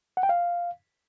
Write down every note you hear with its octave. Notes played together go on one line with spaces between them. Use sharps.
F#5
G5
F5